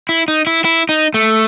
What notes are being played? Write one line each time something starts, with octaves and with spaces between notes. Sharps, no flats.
E4
D#4
E4
E4
D#4
A3